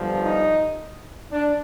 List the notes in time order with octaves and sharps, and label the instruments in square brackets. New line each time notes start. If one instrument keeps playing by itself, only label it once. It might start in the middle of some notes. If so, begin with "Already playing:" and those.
Already playing: [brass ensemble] G1 G2 F3
D#4
D4